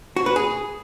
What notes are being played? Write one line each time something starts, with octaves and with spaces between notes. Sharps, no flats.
F#4
B4
G#4